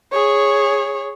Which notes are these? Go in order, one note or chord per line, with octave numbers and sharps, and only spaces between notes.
G#4 C#5